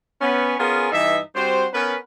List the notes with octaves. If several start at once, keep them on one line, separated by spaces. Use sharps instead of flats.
B3 C#4 B4
B3 C#4 F4 G#4 A#4
G2 E3 D#4 E5
G3 C4 F#4 C5
B3 C#4 A#4 B4